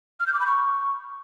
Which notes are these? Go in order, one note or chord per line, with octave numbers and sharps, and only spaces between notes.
F6
G6
D6
B5
C#6